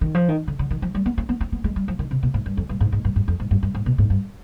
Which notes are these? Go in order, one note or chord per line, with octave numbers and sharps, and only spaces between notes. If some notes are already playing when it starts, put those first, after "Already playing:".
D#3
F3
D#3
D3
D3
D#3
F3
G3
B3
C4
B3
C4
B3
G#3
G3
F3
D#3
C3
B2
G#2
G2
F2
G2
G#2
G#2
G2
G2
F2
G#2
G2
G2
G#2
B2
G#2
G2